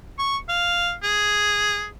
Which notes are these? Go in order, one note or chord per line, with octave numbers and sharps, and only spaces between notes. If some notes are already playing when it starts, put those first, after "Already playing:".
C#6
F5
G#4